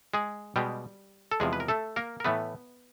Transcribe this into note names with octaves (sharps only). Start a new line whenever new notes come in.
G#3 G#4
B2 G3 G#3 G4
A4
E2 C3 F3 G#3 G#4
B4
A#4
A3 A4
A#3 A#4
A#4
A2 E3 A3 B3 B4